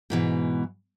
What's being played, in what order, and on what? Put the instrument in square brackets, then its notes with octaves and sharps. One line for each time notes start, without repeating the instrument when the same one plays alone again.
[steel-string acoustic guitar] G#2 B2 E3